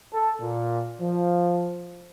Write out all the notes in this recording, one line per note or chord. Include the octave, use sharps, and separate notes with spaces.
A4
A#2
F3